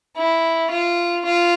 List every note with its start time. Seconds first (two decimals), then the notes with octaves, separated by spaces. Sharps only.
0.17 E4
0.71 F4
1.25 F4